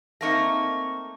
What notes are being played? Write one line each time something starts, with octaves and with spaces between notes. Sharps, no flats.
A3 A#3 C4 D#4 C#6 A#6